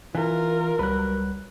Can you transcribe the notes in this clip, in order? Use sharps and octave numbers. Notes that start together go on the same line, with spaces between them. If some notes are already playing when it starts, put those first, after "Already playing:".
E3 F4 A#4
C#2 F#3 G3 B4 F#6